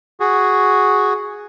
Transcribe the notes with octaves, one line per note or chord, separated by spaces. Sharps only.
F#4 G#4